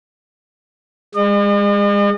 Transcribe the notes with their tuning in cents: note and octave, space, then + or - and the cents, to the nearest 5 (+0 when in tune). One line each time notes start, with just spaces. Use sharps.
G#3 -30 D#5 -45